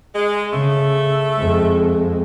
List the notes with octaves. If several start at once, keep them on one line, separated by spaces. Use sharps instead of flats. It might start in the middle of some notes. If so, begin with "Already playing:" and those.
G#3
C#3 A3 A4 E5
F2 G#3